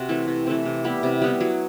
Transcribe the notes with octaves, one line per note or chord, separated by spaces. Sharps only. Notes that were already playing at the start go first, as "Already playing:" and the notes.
Already playing: C3 F#4 C5
E3 A3 C4
C3
E3 A3 C4
C3
G3 B3 E4
C3
G3 B3 E4
F#3